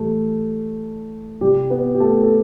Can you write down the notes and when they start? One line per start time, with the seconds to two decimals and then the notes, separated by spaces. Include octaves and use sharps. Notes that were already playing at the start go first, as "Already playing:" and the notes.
Already playing: A2 E3 G3 A3
1.41 C3 G3 G4
1.70 B3 B4
1.95 G4
2.00 A3 A4
2.23 A4